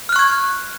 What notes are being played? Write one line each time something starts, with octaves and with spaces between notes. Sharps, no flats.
C#6 F6 F#6 G#6